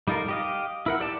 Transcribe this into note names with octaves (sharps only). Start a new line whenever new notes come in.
G3 D#4 F4 A4 A#4
G4 D#5 F5
E4 A#4 F#5
G4 D5 A5